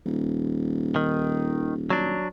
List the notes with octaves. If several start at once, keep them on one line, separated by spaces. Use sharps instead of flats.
D#1
D#3
F#3 D4